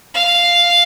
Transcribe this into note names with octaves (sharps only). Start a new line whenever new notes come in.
F5